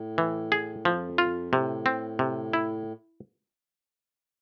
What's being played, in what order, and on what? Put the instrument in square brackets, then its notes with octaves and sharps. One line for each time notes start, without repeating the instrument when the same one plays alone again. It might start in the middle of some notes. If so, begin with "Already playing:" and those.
Already playing: [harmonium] A2
[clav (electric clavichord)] E3
G#4
[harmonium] F2 [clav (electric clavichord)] F3
[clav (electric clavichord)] F4
[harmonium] A2 [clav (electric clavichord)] C3
[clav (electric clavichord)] C4
C3
E4